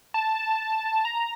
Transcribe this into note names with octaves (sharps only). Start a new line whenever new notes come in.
A5
A#5